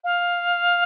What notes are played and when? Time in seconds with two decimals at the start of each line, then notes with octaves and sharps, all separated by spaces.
0.04 F5